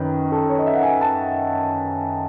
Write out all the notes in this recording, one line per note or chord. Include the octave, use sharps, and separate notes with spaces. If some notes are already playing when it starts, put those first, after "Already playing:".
Already playing: F#2 D#3 B4
A4
C#5
D#5
E5
F#5
G#5
A5